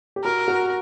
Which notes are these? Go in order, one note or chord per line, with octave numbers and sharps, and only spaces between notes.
G4
F#4 A#4
F#4